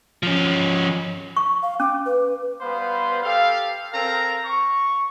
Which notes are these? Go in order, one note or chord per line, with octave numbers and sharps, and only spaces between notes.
F3 C#4
C#6
F5
C#4 D6
B4
G3 B3 B4 C5 F5
G4 A4 F5
C4 A4 A#4 F5 A#5
C#6